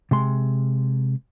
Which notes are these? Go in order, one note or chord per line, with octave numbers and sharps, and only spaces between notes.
C3 G#3 C6